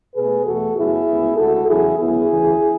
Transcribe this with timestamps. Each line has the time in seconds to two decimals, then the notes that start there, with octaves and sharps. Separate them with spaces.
0.14 B2 A3 G#4 B4
0.45 E2 B2 A3 F#4 A4
0.75 F#2 C#3 F#3 B3 E4 G#4
1.07 D2 C#3 G#3 B3
1.37 D2 C#3 G#3 F#4 A4
1.68 E2 C#3 F#3 E4 G#4
1.98 D2 C#3 F#3 B3 E4 G#4
2.29 D2 C#3 E3